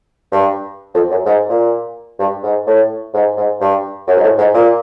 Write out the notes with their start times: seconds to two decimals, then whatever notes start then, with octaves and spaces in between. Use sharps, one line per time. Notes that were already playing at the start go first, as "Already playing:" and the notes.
0.32 G2
0.94 F2
1.10 F#2
1.26 G#2
1.49 A#2
2.19 G2
2.43 G#2
2.67 A2
3.14 G#2
3.37 G#2
3.61 G2
4.07 F#2
4.17 G#2
4.23 A2
4.38 G#2
4.54 A#2